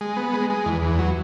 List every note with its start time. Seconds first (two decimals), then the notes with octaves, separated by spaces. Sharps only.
0.01 G#3
0.17 B3
0.33 G#3
0.50 G#3
0.66 E2
0.82 E2
0.99 F#3